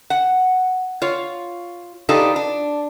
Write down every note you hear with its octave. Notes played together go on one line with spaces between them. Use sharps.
F#5
F4 C#5
D4 D#4 F4 G4 A4 B4
D4